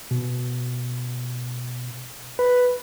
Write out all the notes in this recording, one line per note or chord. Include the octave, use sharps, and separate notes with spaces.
B2
B4